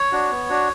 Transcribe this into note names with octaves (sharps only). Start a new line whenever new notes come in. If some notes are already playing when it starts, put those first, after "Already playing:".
Already playing: C#5
D4 F#4
B3
D4 F#4